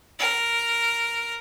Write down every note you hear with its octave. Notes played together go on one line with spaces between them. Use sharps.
A#4